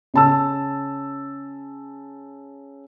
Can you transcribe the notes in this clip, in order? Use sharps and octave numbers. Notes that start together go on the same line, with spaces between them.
C#3 A5 E6